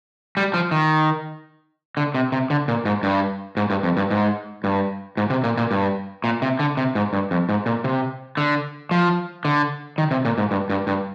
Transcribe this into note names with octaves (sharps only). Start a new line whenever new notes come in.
G3
F3
D#3
D3
C3
C3
D3
A#2
G#2
G2
G#2
G2
F2
G2
G#2
G2
G#2
C3
A#2
A#2
G2
A#2
C3
D3
C3
G#2
G2
F2
G#2
A#2
C3
D3
F3
D3
D#3
C3
A#2
G#2
G2
G2
G2